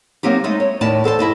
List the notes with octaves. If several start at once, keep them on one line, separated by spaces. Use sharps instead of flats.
F#3 A#3 C4 D#4 G4
G#3 A3 D#4
C#5
D#2 A2 D5 A5
E2 A4 C5 A5
G2 E4 D#5 A5